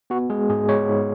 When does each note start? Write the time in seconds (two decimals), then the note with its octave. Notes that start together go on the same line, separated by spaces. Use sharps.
0.10 B3 F#4
0.30 G#3 G#4
0.49 G#2 G#4
0.69 G#3 C#5
0.89 G#2